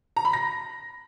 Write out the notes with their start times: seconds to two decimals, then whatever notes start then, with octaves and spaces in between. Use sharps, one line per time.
0.17 A#5
0.25 B5
0.33 A#6